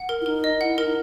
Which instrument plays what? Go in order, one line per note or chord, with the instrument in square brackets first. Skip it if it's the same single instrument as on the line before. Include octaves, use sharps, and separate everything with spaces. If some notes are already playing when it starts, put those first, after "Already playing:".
Already playing: [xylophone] F#5
A#4
[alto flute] E4
[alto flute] D#4 [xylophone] A#4
[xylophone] D#5
[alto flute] E4 [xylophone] F#5
[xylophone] A#4
[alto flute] D#4